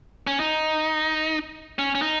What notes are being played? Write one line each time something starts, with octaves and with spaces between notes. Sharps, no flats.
C#4
D#4
C#4
C#4
D#4